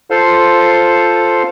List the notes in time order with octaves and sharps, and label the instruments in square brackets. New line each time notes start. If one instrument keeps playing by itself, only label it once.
[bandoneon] F4 A4 C5 F5